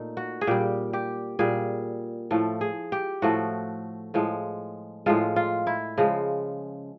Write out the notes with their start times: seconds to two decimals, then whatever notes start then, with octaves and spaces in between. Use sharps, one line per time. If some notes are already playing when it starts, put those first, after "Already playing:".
Already playing: A#2 A3 D#4
0.17 F#4
0.41 G#4
0.47 A#2 G3 G4
0.93 G4
1.39 A#2 G3 G#4
2.31 A2 F3 A3
2.61 G#4
2.92 G4
3.22 A2 F3 A3 F#4
4.14 A2 F3 G#3
5.06 A2 F3 G#3 F4
5.36 F4
5.67 E4
5.98 C#3 F3 G#3